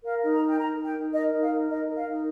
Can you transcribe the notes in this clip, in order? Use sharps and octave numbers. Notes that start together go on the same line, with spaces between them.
A#4 F5
D#4
A#5
A#4
G5
D#4 A#5
A#4
G5
D#4
A#4 D#5
D#4
F5
A#4
D#4 D#5
A#4
F5
D#4